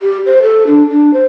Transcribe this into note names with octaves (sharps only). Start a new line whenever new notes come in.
G4
C5
A4
D4
D4
C5